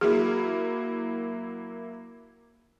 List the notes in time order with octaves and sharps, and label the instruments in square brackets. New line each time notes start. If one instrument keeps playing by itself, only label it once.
[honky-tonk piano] F#3 A#3 E4 [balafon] G#4